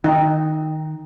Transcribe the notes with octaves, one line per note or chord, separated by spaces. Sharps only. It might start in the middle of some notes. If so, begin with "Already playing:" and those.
D#3 D#4 E5 G5